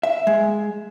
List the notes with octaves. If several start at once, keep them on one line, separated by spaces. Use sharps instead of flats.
E5
G#3